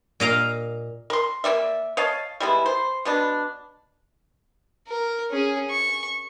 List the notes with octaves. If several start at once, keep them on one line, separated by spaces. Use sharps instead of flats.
A#2 D#5 F5 A#5
A#4 C6
A#3 C#4 D5 E5
C#5 D#5 F5 A5
G3 G#3 B3 E4
C5
B2 B3 D4
A#4
C#4 G#4
C#6